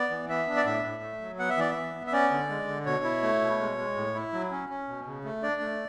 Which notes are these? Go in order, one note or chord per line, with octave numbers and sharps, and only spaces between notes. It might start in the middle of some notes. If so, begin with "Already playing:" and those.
Already playing: B3 D5
E3
B3 E5
D4
D5
A2 E5
A2
A3
F#3
B3 F#5
E5
E3 D5
E5
B3
B3
E5
C#4 D5
D3
G#3
D3
B2 C#5
E4
A3
B2
G#3
G#3
A2
E4
F#3
C#4
C#4
B2
C#3
A3
D4 D5
A3